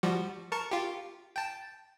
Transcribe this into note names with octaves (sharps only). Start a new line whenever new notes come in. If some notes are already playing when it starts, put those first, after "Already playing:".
F3 G3 F#4
A#4 A5 C#6
F4 G4
G5 A5